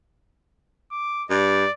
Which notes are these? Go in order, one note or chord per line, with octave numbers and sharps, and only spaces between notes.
D6
G2 D5